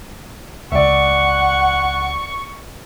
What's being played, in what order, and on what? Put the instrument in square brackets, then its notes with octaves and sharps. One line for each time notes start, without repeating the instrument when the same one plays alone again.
[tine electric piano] C#2 [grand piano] D5 E5 [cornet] F#5 [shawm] C#6